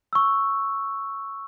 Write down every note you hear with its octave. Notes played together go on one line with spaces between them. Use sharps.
C#6 E6